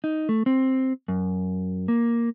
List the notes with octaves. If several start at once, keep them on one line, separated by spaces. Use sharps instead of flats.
D#4
A3
C4
F#2
A#3